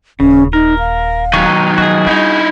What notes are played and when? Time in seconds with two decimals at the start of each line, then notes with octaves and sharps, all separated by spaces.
0.20 D#1 C#3 C#4
0.53 D#4 A#4
0.79 F5
1.33 D#3 F#3 D#4 C#6
1.78 F3 F#4 G#4 D#5
2.06 G3 D#4 E4